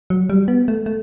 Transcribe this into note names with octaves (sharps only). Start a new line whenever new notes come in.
F#3
G3
B3
A3
A3